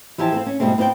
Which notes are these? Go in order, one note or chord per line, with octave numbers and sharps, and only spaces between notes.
E3 F3 G4 E5 G#5 A5
C4 F4 A4
C#4
G#2 B2 G3 A3 C4
B3 C4 F4 D5 G5